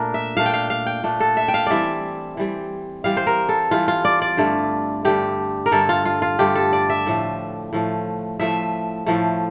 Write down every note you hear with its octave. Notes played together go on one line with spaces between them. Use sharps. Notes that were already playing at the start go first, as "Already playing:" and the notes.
Already playing: A#2 A3 D4 A#4
E5
A#2 A3 D4 F5
G5
F5
F5
G5
A#2 A3 D4
A4
E5
G5
F5
E3 G3 C4 D5 E5
E3 G3 C4
E3 G3 C4 F5
C5
A#4
A4
E3 G3 C4 F4
F4
D5
D5
G2 D3 A3
G2 D3 A3 G4
A#4
G2 D3 A3 A4
F4
F4
F4
G2 D3 A3 G4
A4
D5
E5
A2 F3 A3
A2 F3 A3
A2 F3 A3 E5
A2 F3 A3